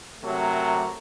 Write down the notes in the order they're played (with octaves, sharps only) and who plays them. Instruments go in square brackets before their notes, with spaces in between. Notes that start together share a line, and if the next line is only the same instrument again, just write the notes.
[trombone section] C3 F#3 A3 A#4